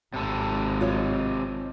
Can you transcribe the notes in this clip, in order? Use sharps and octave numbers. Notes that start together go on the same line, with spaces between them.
G#1 C3 A4
F4 C#5 D#5